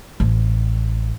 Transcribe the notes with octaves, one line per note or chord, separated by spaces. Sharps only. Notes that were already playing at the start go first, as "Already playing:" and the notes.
A1